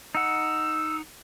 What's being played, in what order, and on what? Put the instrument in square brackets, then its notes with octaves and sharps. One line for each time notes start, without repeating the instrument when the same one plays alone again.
[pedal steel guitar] D#4 F#5 [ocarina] E6